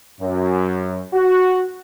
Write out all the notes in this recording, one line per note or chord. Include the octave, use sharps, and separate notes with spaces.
F#2
F#4